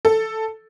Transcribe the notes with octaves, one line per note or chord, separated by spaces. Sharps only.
A4